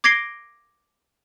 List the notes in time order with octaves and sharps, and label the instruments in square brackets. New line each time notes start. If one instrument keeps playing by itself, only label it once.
[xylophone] D6 G#6 A#6 C7 D7 G7